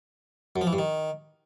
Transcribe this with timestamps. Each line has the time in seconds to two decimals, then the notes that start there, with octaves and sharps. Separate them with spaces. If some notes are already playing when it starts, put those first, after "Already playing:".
0.56 F#2
0.61 F3
0.67 E3
0.73 G2
0.78 D#3